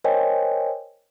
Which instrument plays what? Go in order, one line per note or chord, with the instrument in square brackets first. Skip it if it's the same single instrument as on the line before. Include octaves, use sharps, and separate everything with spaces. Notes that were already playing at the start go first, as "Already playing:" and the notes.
[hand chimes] A#4 C5 C#5 D#5 G5 G#5